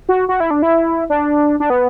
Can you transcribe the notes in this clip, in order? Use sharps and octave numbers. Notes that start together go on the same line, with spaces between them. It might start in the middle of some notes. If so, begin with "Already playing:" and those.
F#4
F#4
E4
D4
E4
D4
D4
B3